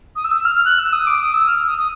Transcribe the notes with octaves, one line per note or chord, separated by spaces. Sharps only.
D#6
E6
E6
F6
F6
F#6
E6
D#6
D6
D#6
E6
F6
E6
D#6
D#6